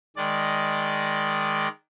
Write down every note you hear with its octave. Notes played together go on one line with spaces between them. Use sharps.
D#3 G#3 D5